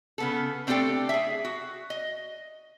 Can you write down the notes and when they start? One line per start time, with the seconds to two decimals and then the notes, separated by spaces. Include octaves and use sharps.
0.18 C#3 B3 A4
0.67 A3 C4 D4 G4 A4 G5
1.09 G#4 E5
1.45 F#4
1.90 D#5